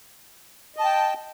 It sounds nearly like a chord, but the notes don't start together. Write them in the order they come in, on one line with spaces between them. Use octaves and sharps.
D#5 A5 G5